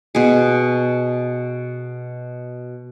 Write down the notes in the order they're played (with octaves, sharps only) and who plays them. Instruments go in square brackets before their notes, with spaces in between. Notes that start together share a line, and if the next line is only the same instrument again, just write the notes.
[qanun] B2 G#4